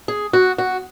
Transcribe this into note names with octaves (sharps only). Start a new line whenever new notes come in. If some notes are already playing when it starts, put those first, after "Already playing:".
G#4
F#4
F#4